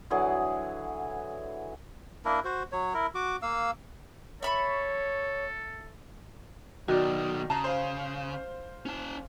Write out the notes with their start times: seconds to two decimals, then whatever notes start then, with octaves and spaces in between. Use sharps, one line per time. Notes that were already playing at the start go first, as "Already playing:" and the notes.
0.10 D3 E3 F#3 G#4
2.25 A#3 D4 E4 A#4
2.44 F#4 C5
2.72 F#3 C#5
2.94 E4 A#4
3.15 F#4 D6
3.42 A#3 F5 E6
4.43 A4 C#5 E5 B5 C#6
6.88 B1 B2 D#3 F#4 D5
7.50 C#3 A5 A#5
7.64 C5 F5
8.86 C#4 A5